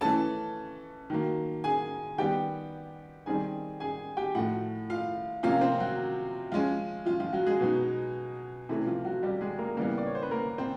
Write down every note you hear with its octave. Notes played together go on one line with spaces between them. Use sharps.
E3 A3 C#4 A4 A5
D#3 F#3 A#3
G#4 G#5
D#3 G3 B3 G4 G5
D#3 G3 C4 D#4 G#4 G#5
G#4 G#5
G4 G5
A2 F3 A3 F#4 F#5
F4 F5
C3 F3 A#3 C#4 F4 F5
C4 C5
F#3 F#4
F3 G#3 C#4 F4
F3 F4
F3 F4
F#3 F#4
G#3 G#4
B2 F#3 B3 D#4
C3 E3 A3 C#4 E4
F3 F4
F#3 F#4
G3 G4
G#3 G#4
A#3 A#4
C#3 E3 G3 A#3 B3 A#4
D5
C#5
C5
B4
A#3 A#4
C4 C5